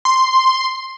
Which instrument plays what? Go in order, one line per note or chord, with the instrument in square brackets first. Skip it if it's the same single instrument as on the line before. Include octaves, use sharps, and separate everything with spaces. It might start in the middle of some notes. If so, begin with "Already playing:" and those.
[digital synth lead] C6